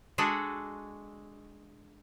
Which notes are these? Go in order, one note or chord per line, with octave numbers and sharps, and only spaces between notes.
G#3 D4 F#4 G#4 A4